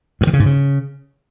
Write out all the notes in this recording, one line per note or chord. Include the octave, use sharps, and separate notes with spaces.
G2
D#3
C#3
G#2
C#3